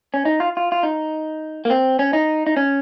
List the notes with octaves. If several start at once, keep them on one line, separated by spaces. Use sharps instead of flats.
C#4
D#4
F4
F4
F4
D#4
A#3
C4
C#4
D#4
D#4
C#4